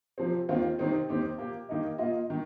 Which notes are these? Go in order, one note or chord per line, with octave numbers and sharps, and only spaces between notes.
C3 F3 C4
D#2 D#3 C4 F4
C3 D#3 C4 D#4
D#2 D#3 C4 D#4 G4
A#2 A#3 G4
D#3 A#3 D#4 G4 D#5
A#2 A#3 F4 D#5
D#3